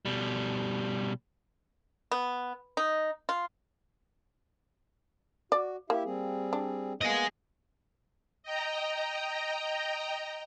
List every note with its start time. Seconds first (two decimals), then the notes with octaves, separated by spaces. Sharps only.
0.05 B2 G3
2.11 B3
2.77 D#4
3.29 F4
5.52 F#4 D5
5.90 A#3 E4 G4 E5
6.05 G3 C4 G#4
6.53 D4
7.01 A#3 B3 G#4 D#5
8.43 D#5 G5 A#5